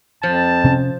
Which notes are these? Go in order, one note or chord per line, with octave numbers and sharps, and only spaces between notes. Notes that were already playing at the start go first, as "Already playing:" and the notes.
F2 F3 A5
C3 C#4